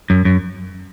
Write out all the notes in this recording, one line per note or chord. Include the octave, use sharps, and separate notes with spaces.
F#2
F#2